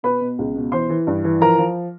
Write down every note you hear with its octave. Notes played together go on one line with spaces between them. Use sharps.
B2 B4 B5
B2
C#2
B2
E3 C5 C6
E3
G2
E3
F3 A#4 A#5
F3